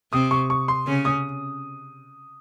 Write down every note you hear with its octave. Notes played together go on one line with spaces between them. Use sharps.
C3 C4 D#6
C#6
C#6
C6
C#3 C#4
D#6